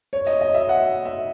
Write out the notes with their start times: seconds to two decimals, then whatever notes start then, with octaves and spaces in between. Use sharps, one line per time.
0.13 C#5
0.27 D#5
0.41 D#5
0.54 E5
0.69 F#5
1.05 E5